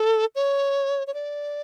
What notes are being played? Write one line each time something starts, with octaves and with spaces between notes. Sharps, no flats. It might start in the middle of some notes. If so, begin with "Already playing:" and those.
Already playing: A4
C#5
C#5
D5